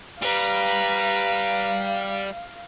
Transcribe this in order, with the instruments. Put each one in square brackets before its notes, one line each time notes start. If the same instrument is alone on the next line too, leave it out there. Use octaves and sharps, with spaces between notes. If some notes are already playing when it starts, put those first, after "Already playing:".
[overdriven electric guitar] G3 [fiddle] B4 A#5 [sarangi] F5